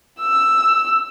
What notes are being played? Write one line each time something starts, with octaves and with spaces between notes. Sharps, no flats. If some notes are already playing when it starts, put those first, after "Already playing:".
E6